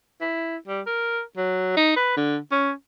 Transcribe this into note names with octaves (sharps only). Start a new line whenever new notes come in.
E4
G3
A#4
F#3
D#4
B4
D3
C#4